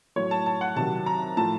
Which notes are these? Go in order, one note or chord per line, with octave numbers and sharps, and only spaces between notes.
A2 F#3 C#5
A5
A5
F#5
C3 D#3 F#3 A5
A#5
A2 F3 A5